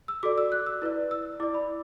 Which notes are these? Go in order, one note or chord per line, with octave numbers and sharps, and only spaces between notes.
E6
F#4 A4 D5 D6
E6
F#6
E6
E4 B4 D5
E6
E4 D5 D6
B5